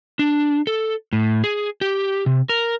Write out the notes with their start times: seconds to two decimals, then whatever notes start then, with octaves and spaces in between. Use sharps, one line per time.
0.19 D4
0.67 A4
1.13 A2
1.44 G#4
1.81 G4
2.26 C3
2.49 A#4